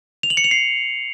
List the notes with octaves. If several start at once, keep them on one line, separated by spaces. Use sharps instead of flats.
F7
F#7
C#7
F7
C7